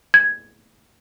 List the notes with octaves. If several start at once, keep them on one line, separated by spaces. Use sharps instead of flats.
G#6